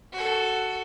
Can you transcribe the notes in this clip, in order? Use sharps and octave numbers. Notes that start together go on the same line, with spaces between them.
F#4 A4